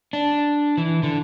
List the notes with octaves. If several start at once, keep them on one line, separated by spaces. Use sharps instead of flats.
D4
E3
D3